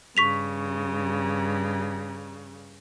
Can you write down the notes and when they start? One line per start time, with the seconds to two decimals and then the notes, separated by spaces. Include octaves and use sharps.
0.17 G2 C#3 C#6 B6 F7